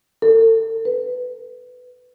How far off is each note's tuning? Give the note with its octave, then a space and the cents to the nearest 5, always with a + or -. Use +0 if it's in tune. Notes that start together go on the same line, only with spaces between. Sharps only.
A4 +35
B4 +15